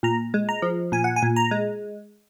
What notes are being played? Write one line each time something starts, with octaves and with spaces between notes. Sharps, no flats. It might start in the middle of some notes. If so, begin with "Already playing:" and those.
A#2 A#5
G#3
A#5
F3
A#2 G#5
F#5
G#5
A#2
A#5
G#3